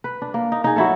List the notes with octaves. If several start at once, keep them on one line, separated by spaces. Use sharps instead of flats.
B4
D4
A#3
D#4
D#4 G#4
F#3 E4 A4